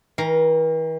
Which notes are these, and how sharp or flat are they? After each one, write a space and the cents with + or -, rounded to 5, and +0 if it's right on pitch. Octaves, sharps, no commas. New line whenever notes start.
E3 -45 A#4 +0 A#5 -5